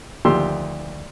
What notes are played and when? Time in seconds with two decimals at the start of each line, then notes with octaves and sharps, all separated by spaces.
0.25 D2 D#3 F3 G4 C6 E6